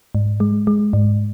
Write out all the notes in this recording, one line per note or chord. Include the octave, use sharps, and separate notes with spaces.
G#2
G#3
G#3
G#2